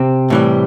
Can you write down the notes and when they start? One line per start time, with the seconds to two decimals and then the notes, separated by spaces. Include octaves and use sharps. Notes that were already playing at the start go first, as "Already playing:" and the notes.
Already playing: C3 C4
0.30 A2 E3 G3